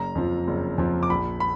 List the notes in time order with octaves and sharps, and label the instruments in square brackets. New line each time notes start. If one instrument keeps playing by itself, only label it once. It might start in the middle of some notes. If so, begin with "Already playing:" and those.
Already playing: [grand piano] F#1 A#5
F2 F3
F#1
F2 F3
D6
A#1 B5
B5